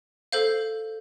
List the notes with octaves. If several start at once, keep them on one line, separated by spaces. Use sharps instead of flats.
A4 C5 F5 G6